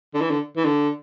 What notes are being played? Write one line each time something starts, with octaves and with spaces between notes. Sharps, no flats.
D3
E3
D3
E3
D3